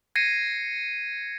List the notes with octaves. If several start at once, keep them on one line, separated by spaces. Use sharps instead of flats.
G#6 A#6 C7 C#7 D#7